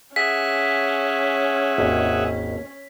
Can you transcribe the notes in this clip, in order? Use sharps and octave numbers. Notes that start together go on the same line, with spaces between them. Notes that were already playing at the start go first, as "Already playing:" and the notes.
C#4 G#4 E5 F#5 B6
G#1 D#2